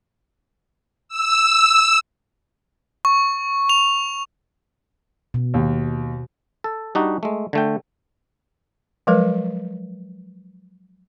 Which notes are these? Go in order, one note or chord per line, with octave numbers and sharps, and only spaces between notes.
E6
C#6
F7
B2
D#2
A4
G3 D4 D#4 F#4
G#3 A3
D3 A3 G5
F3 F#3 G#3 A#4 B4